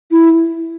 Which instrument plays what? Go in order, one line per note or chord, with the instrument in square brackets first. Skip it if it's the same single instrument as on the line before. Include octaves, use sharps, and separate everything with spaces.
[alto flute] E4